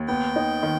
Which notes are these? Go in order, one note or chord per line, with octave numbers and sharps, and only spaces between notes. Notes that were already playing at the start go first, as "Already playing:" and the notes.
Already playing: D#2
B3 G5
D#4
D#3